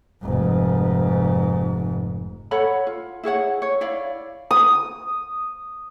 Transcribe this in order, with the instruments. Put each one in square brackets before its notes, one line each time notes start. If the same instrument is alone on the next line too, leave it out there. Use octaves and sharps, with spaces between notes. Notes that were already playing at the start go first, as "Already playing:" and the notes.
[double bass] F1 G#2
[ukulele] A4 C#5 F#5 B5
F4
E4 G#4 C#5 F#5
C#5
E4 C#5 D5 F5
[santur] D#6